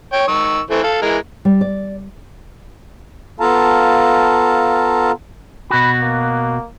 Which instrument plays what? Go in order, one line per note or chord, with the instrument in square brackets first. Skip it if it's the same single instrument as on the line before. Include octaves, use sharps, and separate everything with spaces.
[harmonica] C#5 G5
D#3 C#6 E6
E3 A3 C4
A4 F5
E3 G#3 A#4
[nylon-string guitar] G3
D5
[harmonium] B3 F4 A4 F5 A5 A#5
[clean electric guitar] B2 F#4 [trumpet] B5
[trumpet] A#3